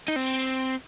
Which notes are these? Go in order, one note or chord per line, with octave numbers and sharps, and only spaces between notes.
D#4
C4